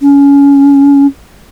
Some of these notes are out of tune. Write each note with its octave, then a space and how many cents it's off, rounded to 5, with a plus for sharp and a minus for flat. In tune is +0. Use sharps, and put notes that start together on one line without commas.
C#4 +20